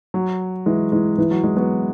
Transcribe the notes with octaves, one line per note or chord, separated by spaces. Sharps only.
F#3
E3 G#3
E3 G#3
E3
F#3
E3 G#3
F#3 B3